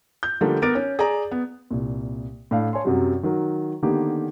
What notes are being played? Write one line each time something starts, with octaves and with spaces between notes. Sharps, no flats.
G6
D3 F3 G3 A3 A#3 D4
B3 A#4 D6 A6 D7
C#4
G#4 D5 A#5
B3
C2 A#2
A2 D4 F5
C#5 G#5 A5 C6
F#2 C3 F#3 G3
D#3 F#3 A#4
D3 D#3 A#3 B3 G4